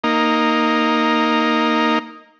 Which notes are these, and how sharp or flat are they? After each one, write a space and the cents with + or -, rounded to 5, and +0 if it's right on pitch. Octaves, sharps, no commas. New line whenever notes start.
A#3 +0 D#4 +0